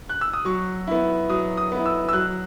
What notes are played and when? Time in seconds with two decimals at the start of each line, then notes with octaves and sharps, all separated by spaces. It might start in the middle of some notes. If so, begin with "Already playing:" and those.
0.09 F#6
0.21 E6
0.33 D#6
0.45 F#3 C#6
0.87 B3 E4
1.30 F#3 D#6
1.57 D#6
1.72 B3 E4
1.86 E6
2.09 E6
2.13 F#3 F#6